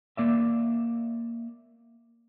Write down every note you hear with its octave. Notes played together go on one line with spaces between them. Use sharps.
A#3 D5 E5